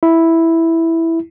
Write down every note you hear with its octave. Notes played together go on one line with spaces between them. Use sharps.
E4